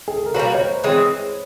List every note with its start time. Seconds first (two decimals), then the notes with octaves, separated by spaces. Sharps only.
0.08 G#4
0.16 A4
0.26 A#4
0.34 G3 A#3 D4 F#4 B4
0.55 C#5
0.60 C5
0.84 E3 G#3 C4 C#5